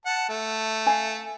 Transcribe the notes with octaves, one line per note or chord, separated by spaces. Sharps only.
F#5 A5
A3
F5 G#5